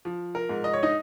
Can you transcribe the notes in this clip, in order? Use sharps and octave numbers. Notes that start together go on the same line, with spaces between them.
F3
A#4
G#2
D#5
C#5
D#4 D#5